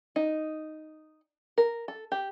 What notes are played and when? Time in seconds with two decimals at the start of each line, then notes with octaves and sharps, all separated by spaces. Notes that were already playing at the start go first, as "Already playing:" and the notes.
0.16 D#4
1.58 A#4
1.88 A4
2.12 G4